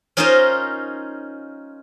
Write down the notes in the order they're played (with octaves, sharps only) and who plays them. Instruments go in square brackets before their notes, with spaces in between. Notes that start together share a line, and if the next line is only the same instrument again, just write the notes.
[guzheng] C#4 D#4 F4 A#4 C5 D#5